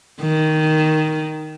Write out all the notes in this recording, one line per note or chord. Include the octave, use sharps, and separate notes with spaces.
D#3